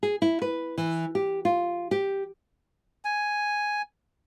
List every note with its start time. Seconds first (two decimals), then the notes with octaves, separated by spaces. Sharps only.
0.03 G#4
0.22 E4
0.42 B4
0.78 E3
1.15 G4
1.45 F4
1.91 G4
3.05 G#5